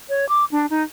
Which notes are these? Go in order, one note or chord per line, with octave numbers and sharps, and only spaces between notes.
C#5
D6
D4
D#4